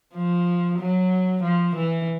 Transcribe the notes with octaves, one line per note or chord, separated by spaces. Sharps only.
F3
F#3
F3
E3